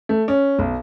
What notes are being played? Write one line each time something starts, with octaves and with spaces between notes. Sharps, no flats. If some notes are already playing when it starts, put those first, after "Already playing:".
A3
C#4
B1